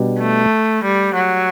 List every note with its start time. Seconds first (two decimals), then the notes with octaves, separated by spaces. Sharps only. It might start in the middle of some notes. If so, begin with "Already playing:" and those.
Already playing: B2 G3 D4
0.20 A3
0.84 G3
1.15 F#3